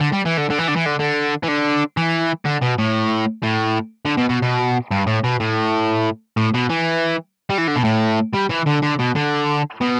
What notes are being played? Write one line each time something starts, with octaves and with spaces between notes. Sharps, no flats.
D3
G3
E3
D3
D3
E3
D3
E3
D3
D3
E3
D3
E3
D3
B2
A2
A2
D3
B2
B2
B2
G2
A2
B2
A2
A2
B2
E3
G3
E3
D3
B2
A2
G3
E3
D3
D3
B2
D3
B2